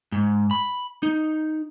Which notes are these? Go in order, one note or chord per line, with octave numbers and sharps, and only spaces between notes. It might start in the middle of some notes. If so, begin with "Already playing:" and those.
G#2
B5
D#4